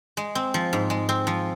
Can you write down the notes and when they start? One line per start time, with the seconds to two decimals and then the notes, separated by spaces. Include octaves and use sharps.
0.17 G#3
0.35 C4
0.54 F3
0.73 G#2
0.90 G#3
1.09 C4
1.27 F3